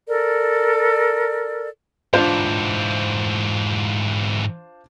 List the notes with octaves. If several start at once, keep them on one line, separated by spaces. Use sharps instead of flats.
A4 A#4 D5
G#2 E3 D4 F4 C5